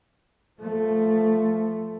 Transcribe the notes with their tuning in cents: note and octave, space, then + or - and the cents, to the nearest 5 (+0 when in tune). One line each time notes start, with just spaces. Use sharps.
F3 -5 A3 +0